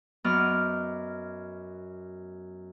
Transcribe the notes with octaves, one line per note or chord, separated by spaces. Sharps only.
F#2 B3 D5 D#5 F6